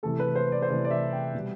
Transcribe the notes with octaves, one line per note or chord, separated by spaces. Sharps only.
C3 E3 A3 A4
B4
C5
D5
C5
C3 E3 A3 D5
D5
E5
G5
B2 G3